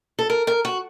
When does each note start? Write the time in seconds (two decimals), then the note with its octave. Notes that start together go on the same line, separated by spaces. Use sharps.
0.19 A4
0.30 A#4
0.47 A#4
0.65 F#4